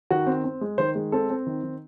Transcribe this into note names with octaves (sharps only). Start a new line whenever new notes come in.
D#3 F#4
C4
C4
G#3
D#3 C5
G#3
C4 A4
C4
D#3
D#3